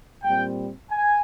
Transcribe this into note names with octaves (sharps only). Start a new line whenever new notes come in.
A#2 G3 C4 G5
G#5